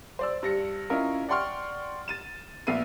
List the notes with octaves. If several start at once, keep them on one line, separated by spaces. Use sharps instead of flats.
C5 D5 E6
G2 A#6 C#7
C#4 E4 F4 A#4 D#5
D5 F#5 G5 C6 C#6 F6
A6 D#7 E7
A#1 B3 E5 C7 D#7